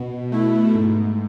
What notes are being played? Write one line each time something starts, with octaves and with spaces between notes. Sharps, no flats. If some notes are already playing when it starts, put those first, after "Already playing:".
Already playing: B2
A3 E4
G#2